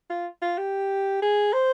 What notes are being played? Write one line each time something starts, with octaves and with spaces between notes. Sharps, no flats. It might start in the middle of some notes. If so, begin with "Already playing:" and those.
F4
F4
G4
G#4
C5